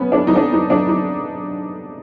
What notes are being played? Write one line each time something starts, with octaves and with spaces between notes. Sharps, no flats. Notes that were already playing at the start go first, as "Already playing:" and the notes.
Already playing: B3 C#4
D4
D#4
D4
D#4
D4
D#4